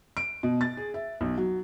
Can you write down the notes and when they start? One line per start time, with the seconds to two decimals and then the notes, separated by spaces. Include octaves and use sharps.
0.17 D7
0.43 B2
0.61 A6
0.77 G#4
0.94 E5
1.21 B1
1.38 F#3